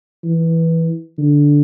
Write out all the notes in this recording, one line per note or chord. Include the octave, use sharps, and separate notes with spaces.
E3
D3